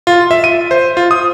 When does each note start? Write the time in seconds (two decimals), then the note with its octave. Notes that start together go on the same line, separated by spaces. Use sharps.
0.07 F4
0.31 E5
0.44 D#7
0.71 C5
0.97 F4
1.11 D#6